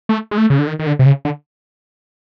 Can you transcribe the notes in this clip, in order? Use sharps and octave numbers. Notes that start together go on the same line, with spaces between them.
A3
G#3
A3
C#3
D3
D#3
D#3
D3
C3
C#3
D3